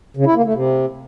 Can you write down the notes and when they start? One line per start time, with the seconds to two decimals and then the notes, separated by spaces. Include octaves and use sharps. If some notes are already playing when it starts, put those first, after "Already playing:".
0.17 C#3
0.26 E4
0.35 A#3
0.45 A3
0.54 C3